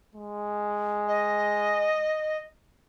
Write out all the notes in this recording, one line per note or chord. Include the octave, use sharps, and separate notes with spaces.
G#3
D#5